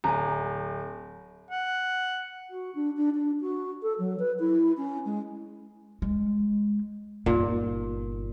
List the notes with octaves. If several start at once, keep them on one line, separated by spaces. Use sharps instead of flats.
D1 G#5 A#5
F#5
F#4
D4
D4
D4
F#4
A4
F#3
B4
E4
C#4
G#3
G#3
G1 A#2 D#4